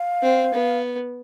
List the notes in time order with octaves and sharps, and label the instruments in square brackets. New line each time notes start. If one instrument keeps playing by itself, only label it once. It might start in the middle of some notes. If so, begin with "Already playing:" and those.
Already playing: [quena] F5
[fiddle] C4
B3